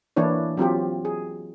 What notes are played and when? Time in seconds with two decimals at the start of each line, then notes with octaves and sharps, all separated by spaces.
0.17 E3 A#3 D4 E4 C#5
0.57 F#3 C4 F4 G4
1.05 G#4